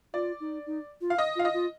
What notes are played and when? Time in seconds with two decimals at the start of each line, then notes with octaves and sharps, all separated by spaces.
0.14 F4 D5
0.40 D#4
0.66 D#4
1.01 F4
1.10 F5
1.18 D#5
1.36 F4 F5
1.45 D#5
1.54 F4